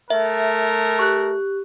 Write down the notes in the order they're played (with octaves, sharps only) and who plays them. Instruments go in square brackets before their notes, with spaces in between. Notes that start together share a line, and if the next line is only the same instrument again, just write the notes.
[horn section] A3 A#4 [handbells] E5
[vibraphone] G4 [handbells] C#6 F#6